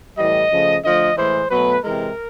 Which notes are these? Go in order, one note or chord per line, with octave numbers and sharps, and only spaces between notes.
A2 E3 G3 D#5
C#3 F3 A3
D3 F3 A3 D#5
A2 E3 G#3 C5
B2 F#3 A3 B4
C3 E3 G#3 A#4